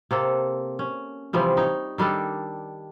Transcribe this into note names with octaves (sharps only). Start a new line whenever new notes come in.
C3 A#3 A4
C#4
C3 E3 F3 G3
D#4 C#5
D#3 G3 D4 A4